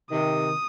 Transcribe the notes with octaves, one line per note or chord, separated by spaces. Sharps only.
C3 D#3 D#6